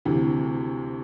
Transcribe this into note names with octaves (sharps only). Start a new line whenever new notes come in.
D2 C3 E3